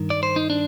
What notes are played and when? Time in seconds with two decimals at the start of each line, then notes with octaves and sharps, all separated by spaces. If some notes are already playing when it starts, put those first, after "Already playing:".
Already playing: G2 D#3
0.10 D5
0.23 C5
0.36 D#4
0.50 D4